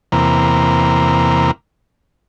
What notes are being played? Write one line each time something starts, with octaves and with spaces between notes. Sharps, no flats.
E2 C3 A#3